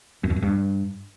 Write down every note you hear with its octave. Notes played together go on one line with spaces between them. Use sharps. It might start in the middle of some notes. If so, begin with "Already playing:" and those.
F#2
E2
F#2
G2